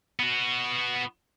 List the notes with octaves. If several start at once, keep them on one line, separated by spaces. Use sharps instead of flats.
B3 F#4